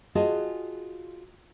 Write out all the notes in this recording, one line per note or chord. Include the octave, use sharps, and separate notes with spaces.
F4 F#4 G#4 D#5 G#5 A5